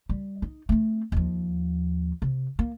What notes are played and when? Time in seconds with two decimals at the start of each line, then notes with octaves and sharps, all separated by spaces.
0.09 G3
0.42 D#4
0.69 A3 C4
1.12 D#2 F3
2.22 C3
2.59 A#3